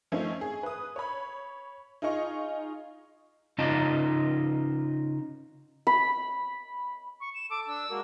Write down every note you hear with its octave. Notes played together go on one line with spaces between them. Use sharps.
F3 A3 C4 C#4 D#4
G#4
B4 D#6
C#5 B5
D#4 F4 G#4 D#5 C#6
C#3 C#4 D#4 F4 D#5 A5
B5
C#6
E7
A4 D6
D4 E6
G#3 A#3 F#4 A#4